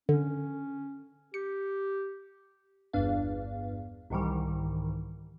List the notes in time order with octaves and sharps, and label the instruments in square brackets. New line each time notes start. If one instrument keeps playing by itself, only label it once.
[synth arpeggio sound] D3 [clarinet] C#4
[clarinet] G4 [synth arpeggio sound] C#7
[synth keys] G1 E2 G2 D4 F5
C2 G#2 D#3 E3 G3